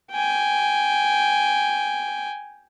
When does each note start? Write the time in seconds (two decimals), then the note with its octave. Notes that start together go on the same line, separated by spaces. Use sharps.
0.12 G5 G#5